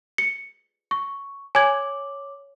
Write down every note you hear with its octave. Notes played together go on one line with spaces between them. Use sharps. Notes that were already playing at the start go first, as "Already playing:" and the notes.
C#7
C#6
C#5 G#5 D6 G#6 F#7